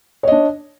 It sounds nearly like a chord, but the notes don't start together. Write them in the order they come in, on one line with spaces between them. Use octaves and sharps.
C#5 D#5 D4